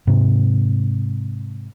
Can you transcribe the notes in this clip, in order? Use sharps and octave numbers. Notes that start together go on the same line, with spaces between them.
G#2 C3